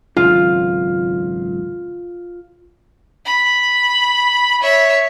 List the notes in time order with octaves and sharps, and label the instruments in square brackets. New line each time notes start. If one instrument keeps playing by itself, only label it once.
[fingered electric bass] G#1 C#2 F#2 [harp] F4
[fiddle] B5
C#5 E5